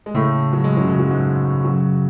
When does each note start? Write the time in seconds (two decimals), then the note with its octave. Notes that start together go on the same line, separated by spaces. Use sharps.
0.06 G#3
0.14 A2 C#3 A3
0.53 F#3
0.64 G#3
0.77 F#2 F#3
0.89 C#3 G#3
0.99 F#3
1.11 G#2 G#3
1.64 F#2 F#3